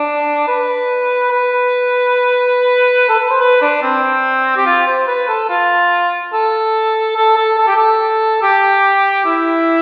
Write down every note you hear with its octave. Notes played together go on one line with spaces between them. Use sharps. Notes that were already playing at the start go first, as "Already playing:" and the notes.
Already playing: D4
B4
B4
A4
B4
C5
B4
D4
C4
G4
F4
C5
B4
A4
F4
A4
A4
A4
A4
G4
A4
G4
E4